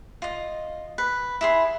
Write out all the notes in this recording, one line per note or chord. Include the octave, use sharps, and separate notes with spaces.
F4 D#5
B4
E4 G#4 C6